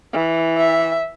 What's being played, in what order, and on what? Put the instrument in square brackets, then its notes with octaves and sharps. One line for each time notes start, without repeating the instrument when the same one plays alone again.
[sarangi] E3
[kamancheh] E5